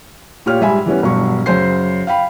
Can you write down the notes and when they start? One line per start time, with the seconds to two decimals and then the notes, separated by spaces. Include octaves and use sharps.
0.46 A#2 F4 G4 C#5 F6
0.61 G#2 G3 E5 G#5 B5
0.86 E3 G3 B3 C#4
1.02 E1 G2 F#3 C#6
1.46 F#2 C#3 C5 C7
2.07 F5 G5 B5